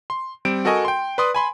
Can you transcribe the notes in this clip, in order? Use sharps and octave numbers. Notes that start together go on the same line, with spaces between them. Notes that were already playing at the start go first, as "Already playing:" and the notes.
C6
G3 C4 D7
F#4 A4 A#4 D#5 G#5 C#6
G5 C6
B4 D5 C6 D#6
G#5 B5 C6